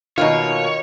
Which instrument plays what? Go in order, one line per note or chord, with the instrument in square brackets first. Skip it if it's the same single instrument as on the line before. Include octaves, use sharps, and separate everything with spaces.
[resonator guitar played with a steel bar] B2 A#3 F4 [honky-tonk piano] D#3 D#4 [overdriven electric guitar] C#5